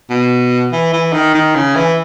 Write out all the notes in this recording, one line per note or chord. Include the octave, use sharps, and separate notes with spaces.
B2
E3
E3
D#3
D#3
C#3
E3